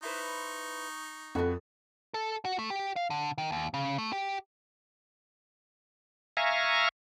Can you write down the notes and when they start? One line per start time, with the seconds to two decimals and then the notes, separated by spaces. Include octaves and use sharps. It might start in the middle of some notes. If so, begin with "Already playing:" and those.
0.03 D#4 E4 B4 C5 C#6
1.35 F2 B3 F#4 A4
2.14 A4
2.45 F#4
2.59 A3
2.70 G4
2.96 F5
3.10 D3
3.38 D#3
3.52 D#2
3.74 C#3
3.98 A3
4.13 G4
6.37 E5 F5 G#5 A#5 C#6